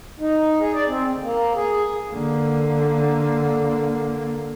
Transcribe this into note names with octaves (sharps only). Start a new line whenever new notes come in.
D#4
G#4
D5
C4
D2
A#3
G#4
D3 A#3